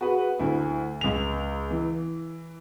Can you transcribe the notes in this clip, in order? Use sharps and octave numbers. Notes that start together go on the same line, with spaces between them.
F#4 G#4 B4
D2 E4
C#2 F7
E3